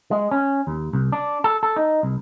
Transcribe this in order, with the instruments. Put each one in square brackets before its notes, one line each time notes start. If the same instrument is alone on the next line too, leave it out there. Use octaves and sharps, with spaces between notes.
[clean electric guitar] G#3
C#4
D#2
C2
D4
A4
A4
D#4
C2